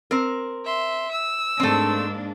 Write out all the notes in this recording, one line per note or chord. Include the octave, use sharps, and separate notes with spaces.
C4 A#4
E5 C6
E6
G#2 A3 A#3 C4 D4